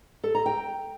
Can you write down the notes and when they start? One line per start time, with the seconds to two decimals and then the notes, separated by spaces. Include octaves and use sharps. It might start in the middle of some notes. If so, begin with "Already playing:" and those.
0.24 A4
0.35 A#5
0.46 G5